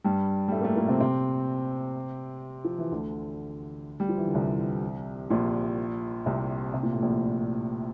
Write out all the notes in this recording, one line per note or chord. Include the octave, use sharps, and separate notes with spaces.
G2 G3
G3
A2 A3
A#3
A2 A3
A#2 A#3
C3 C4
C3 C4
F3
E3
D2 D3
G3
F3
E3
D3
C2 C3
A#1 A#2
C2 C3
C3
A#2
A2
A#1 A#2